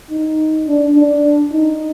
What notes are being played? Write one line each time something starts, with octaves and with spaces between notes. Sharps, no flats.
D#4
D4
D4
D#4